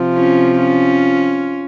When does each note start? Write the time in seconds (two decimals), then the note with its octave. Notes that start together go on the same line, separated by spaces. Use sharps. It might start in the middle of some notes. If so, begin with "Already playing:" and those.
Already playing: C3 F3
0.15 C#4 F4
0.59 C#4 F4